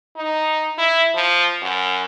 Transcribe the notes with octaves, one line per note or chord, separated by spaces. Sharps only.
D#4
E4
F3
F#2